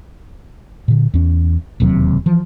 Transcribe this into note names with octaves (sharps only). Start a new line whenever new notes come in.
A#2 D3
E2 C#4
E1 D#2 C3 F#3
E3 F3